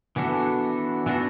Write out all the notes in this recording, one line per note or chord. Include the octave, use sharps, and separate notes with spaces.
E3 B3 D4 F#4 A4
E3 B3 D4 F#4 A4